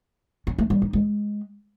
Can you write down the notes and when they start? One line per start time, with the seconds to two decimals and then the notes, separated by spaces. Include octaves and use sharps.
0.47 C#4
0.59 A3
0.70 G3
0.82 D#4
0.93 G#3